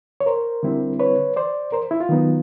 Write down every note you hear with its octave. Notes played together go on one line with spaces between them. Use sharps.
C#5
A#4 C5
D3 G3 C4 E4
B4 C#5
C5 D5
A#4 C5
E4
F4
D#3 F#3 B3 D#4